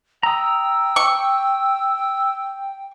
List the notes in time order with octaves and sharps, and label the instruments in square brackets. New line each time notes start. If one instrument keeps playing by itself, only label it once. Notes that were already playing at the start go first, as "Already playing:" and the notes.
[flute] G5 [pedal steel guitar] A#5 D#6 [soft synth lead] E6
[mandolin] C#6